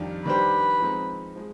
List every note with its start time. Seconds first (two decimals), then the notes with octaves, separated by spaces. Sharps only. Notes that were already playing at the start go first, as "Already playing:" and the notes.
Already playing: F2 D#3 G3 D4 F4
0.25 D#3 G3 D4 G4 B4 C5
0.80 F3 G#3 C4 D#4
1.36 F3 G#3